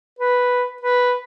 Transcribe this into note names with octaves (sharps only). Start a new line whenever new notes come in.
B4
B4